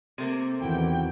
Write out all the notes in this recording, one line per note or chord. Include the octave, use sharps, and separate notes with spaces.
C3 A3 A#3 C4 A#4 C5
E2 D#3 E3 E4 F#4 G5